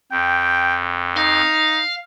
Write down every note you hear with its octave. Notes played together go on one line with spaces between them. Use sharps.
F2 G5
D#4 F5